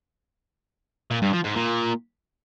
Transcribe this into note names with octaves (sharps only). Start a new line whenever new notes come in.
A#2
G2
F3
G#2
A#2